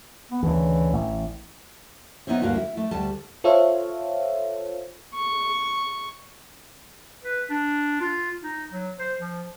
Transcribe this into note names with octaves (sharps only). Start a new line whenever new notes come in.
B3
D2 C#3 E3
A1
B3 D#4 E4 C5 C#5
D2 G2 A#3 F#4 F5
E4
A3
D2 G3 A5
F4 A4 C5 C#5 E5 F5
C#6
B4
D4
F4
D#4
F#3
C5
F3